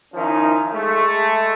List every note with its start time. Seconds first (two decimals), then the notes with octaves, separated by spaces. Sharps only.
0.14 D#3 F3 C#4 D#4 E4
0.73 G#3 A3